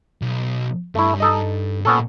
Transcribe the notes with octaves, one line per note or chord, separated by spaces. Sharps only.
B1
G2 A3 E4
D#4 A4 D#5
A#2 B3 C#4 A4